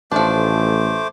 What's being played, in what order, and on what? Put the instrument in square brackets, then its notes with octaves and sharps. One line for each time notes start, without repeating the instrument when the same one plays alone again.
[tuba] A1 [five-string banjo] F3 D4 [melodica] A3 C5 D6